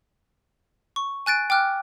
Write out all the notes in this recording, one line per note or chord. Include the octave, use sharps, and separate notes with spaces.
C#6
G#5 F#6 A6 D7
G5 D6 F6 F#6